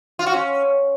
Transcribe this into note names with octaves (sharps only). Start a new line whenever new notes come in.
F4
F#4
C#4